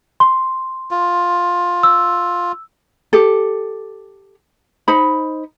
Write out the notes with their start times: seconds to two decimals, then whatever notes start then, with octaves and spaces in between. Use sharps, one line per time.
0.20 C6
0.91 F4
1.83 E6
3.13 G4 A4
4.88 D#4 C5 B5